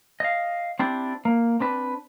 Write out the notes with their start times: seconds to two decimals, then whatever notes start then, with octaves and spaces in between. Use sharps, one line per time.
0.20 D#5 F5
0.79 C4 D4 E4 G4
1.25 A#3
1.60 C4 D4 B4